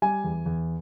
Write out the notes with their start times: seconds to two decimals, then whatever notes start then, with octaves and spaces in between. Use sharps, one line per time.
0.02 G3 G#5
0.24 E2
0.46 E2